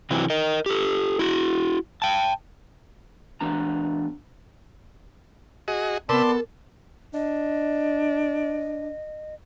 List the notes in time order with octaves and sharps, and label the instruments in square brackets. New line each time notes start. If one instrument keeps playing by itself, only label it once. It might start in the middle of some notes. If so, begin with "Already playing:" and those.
[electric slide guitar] C3 E3 F#3 C4
A#4 D#5
G4 A4
E4 F#4
G5 A5
E3 B3 D4 A#5
[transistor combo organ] F#4 G#4 D#5
[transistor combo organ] C3 B4 E6 [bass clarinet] B3 [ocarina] A#4 [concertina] D5 A5 C6
[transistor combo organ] A4
[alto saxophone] D4 [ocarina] D#5